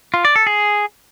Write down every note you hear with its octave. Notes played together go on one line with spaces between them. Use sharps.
F4
D5
A4
G#4